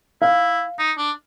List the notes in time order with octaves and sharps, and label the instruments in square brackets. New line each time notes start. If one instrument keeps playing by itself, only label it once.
[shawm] E4 [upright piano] F5
[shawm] D#4
D4